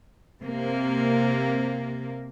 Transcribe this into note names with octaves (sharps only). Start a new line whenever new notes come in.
C3 A#3